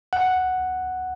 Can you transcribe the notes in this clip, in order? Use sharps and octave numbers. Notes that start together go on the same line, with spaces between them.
F#5